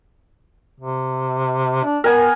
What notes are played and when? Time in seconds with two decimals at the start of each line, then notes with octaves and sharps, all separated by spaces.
0.80 C3
1.84 D4
2.04 B3 A#4 G#5